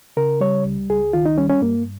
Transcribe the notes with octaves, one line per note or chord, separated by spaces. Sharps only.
C#3 A#4
G3 C#5
C#2
C#2 G#4
D#3 F4
D#4
G3 C#4
C#4
G2 A#3